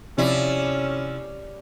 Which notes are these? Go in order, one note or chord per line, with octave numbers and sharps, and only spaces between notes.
C3 F3 C#4 E4 G4 D5